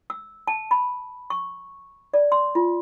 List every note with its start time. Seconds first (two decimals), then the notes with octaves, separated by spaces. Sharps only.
0.10 E6
0.47 A5
0.71 B5
1.30 C#6
2.14 D5
2.32 C6
2.55 F4